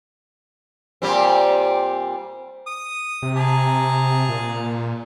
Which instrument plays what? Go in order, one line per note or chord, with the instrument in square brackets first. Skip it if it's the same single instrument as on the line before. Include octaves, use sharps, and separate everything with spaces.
[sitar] A#2 G3 C4
[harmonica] D#6
[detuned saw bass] C3
[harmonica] G#4 A5 A#5
[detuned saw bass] A#2